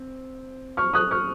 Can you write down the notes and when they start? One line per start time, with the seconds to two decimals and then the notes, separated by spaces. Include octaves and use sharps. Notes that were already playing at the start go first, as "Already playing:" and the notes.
Already playing: C4
0.77 C#6 F6
0.94 D#6 F#6
1.11 C#6 F6